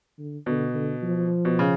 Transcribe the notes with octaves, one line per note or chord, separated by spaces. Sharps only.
D3
B2 D3
D3
F3
B2
C#3